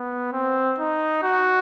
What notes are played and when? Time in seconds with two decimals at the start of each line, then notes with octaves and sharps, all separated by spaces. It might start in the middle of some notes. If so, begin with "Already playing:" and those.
Already playing: B3
0.33 C4
0.79 D#4
1.23 F#4